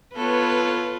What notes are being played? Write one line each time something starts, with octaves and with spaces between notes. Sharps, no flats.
B3 F4 A4 B4 C#5